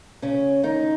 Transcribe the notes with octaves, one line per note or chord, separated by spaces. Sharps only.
C#3 C#4
D#3 D#4